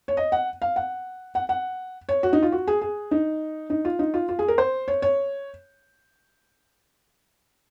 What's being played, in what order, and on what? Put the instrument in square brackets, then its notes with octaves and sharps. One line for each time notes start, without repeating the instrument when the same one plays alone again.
[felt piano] C#5
D#5
F#5
F5
F#5
F#5
F#5
C#5
F#4
D#4
F4
F#4
G#4
G#4
D#4
D#4
F4
D#4
F4
F4
G#4
A#4
C5
C#5
C#5